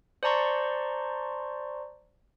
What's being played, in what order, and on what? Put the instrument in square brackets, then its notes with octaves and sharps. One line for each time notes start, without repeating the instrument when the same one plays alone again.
[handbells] C5 D5 A5 A#5 C6 C#6